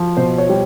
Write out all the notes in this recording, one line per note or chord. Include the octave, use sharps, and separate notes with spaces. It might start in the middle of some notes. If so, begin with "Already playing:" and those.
Already playing: F3
B2 C5
C#5
G3